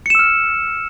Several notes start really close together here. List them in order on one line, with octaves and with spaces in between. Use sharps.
C#7 E7 E6 F6